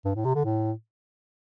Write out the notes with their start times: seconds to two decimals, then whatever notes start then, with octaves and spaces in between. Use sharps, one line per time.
0.05 G2
0.15 A2
0.25 C3
0.35 D3
0.45 A2